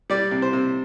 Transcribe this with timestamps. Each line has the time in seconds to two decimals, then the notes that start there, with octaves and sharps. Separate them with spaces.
0.10 G3 D5
0.31 C3
0.42 C5
0.53 C3